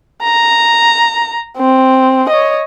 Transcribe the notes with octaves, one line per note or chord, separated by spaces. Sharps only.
A#5
C4
C#5 D#5